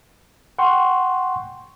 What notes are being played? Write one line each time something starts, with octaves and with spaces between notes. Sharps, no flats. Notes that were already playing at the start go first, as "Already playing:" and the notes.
F#5 G5 C6 C#6